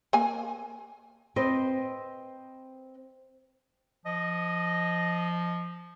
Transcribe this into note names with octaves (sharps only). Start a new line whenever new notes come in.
A#3 G#5
C4 B4 C5 D#5
F3 D#5